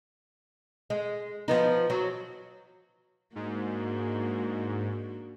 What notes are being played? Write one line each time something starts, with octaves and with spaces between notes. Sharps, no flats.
G#3
F3 B3 D#4
F#3
G#2 A#3 D4 F#4